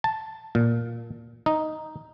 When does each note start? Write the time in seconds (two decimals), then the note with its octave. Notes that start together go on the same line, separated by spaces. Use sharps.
0.04 A5
0.55 A#2
1.46 D#4